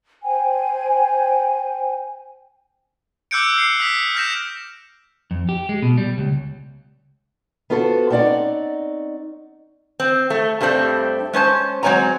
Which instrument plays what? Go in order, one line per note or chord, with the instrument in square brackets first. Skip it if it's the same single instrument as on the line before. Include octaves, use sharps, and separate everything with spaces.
[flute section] C5 G5 G#5
[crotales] D6 E6 F#6 G6 C#7 D7
F6 C7 C#7
D#6 F6 B6
F6 G6 A#6 E7
[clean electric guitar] F2
G4
G#3
B2
G3
C#2
[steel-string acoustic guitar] B3 F4 F#4 A4 B4 C5
C4 C#4 D#4 D5 F#5
[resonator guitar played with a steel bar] C4
A3
G2 G3 A3 C4 D4
G#3 C#4 C5 A5
F#3 G#3 C4 C#5 G#5 A#5